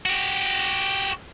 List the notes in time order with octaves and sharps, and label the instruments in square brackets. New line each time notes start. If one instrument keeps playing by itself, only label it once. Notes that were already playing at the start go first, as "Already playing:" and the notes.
[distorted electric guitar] F#4 G4